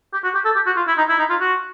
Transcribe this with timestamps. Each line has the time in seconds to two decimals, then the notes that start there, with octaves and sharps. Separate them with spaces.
0.13 G4
0.24 F#4
0.35 G4
0.45 A4
0.56 G4
0.66 F#4
0.76 F4
0.87 E4
0.98 D#4
1.09 E4
1.19 D#4
1.30 F4
1.41 F#4